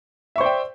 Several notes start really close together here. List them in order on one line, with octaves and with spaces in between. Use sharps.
E5 C#6 C5 D5 G5